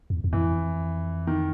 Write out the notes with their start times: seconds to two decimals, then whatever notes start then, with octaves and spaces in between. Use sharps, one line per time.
0.10 E2
0.24 E2
0.33 F2 E3
1.27 D#3